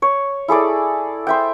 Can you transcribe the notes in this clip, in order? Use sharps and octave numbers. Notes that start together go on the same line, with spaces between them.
C#5
E4 G#4 A4 D5
C5 E5 G5